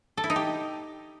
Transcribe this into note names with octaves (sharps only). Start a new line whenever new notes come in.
A4
E4
D#4
G4